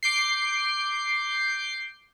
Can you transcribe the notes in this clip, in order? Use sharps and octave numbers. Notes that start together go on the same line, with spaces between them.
D6 G6 C7